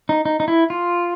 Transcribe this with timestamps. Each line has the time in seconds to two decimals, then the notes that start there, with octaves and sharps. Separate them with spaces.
0.09 D#4
0.25 D#4
0.40 D#4
0.48 E4
0.70 F4